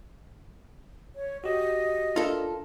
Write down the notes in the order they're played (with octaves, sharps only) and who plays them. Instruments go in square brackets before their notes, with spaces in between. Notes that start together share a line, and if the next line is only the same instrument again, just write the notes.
[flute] C#5
[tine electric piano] F#4 G4 [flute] D#5
[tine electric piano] D4 A#4 [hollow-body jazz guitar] F4 A4